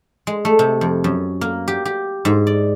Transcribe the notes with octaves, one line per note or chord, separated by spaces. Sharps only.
G#3
A3
C3
F2
F#2
A#3
G4
G4
G#2
D5